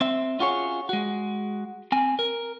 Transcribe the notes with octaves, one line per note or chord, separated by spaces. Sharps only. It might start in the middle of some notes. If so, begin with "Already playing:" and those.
C4 E5
C#4 F4 F#4 G#4 C#5
G#3 F#4
C4 G#5
A#4